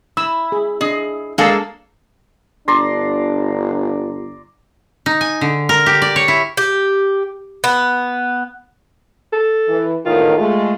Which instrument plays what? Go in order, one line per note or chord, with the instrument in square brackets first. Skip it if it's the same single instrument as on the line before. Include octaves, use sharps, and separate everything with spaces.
[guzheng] E4 [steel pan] E6
[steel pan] G#4
[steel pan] D4 D#5 [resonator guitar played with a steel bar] G#4
[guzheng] G#3 A#3 [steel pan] D4 A5 E6 [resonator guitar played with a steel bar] G#4 A4 F5
[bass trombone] G1 [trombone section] D4 [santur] D5 A#5 C6
[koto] D#4
G#5
D3
A#4
G4
D5
C#5
E4
[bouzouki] G4
B3
[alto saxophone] A4
[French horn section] E3
[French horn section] E2 A2 D#3 [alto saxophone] F4
[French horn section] G#3 A3 [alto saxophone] F4